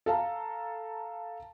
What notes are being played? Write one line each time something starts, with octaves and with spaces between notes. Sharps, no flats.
A4 F5 A5 A#5